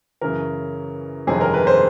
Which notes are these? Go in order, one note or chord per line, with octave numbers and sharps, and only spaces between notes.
F#2 C#3 E3 A#4
G1 F2 C3 D#3 G#3 G#4
A#4
B4
C5